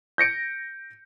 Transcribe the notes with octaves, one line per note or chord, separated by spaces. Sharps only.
G6 A#6 C#7 D7